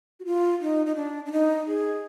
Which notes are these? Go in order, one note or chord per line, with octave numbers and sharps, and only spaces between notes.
F#4
F4
D#4
D#4
D4
D4
D#4
G#4